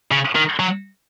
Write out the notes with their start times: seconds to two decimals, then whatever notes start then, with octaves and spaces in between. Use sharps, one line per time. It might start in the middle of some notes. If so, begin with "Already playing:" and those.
0.11 C#3
0.35 D#3
0.60 F#3